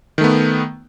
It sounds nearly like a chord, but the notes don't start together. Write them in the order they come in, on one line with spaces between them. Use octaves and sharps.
D#3 A3 B3